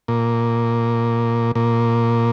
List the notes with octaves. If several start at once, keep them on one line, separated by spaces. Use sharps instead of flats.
A#2
A#2